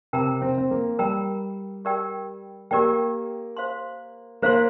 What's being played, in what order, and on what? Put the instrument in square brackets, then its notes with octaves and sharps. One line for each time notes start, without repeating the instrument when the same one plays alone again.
[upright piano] C3 [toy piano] A#4 G5 A#5
[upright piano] C4
C4
A#3
[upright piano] G3 [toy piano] A#4 G5 A#5
[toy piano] G4 A#4 D5 G5
[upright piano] A#3 [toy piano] G4 A#4 D5 G5
[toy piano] C5 F5 C6
[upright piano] A#3 [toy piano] C5 F5 C6